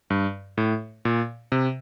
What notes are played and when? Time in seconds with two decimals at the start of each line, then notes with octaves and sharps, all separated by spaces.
0.10 G2
0.58 A2
1.05 A#2
1.52 C3